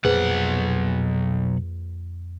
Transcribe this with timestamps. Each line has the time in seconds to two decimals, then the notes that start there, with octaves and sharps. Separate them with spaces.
0.04 B1 F2 A#2 G#4 B4 C5 F#5